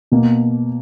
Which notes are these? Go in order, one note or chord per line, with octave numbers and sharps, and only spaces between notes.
B2 A#3